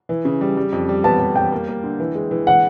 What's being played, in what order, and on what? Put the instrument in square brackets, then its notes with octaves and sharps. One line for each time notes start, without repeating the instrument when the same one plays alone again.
[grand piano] E3
C#3
G3
G3
F2
G3
[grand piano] B3 [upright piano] A5
[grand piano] G3
[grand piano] G3 [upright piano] G5
[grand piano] A#3
A#3
D3
E3
G#3
E3
[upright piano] F#5